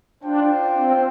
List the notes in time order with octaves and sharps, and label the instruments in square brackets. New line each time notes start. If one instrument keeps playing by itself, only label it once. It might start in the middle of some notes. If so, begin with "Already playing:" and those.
[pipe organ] D4 [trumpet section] F4 C5 G5
[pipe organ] C4